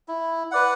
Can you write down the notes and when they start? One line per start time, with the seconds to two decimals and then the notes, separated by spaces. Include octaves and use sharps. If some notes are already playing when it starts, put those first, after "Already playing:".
0.08 E4
0.51 B4 D5 F#5